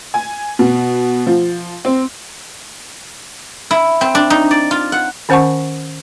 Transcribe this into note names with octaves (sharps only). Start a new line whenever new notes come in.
G#5
B2
F3
C4
E4
C4
D4
D#4
D5
F4
F#5
D#3 C#4 C5 F#5 A5 C#6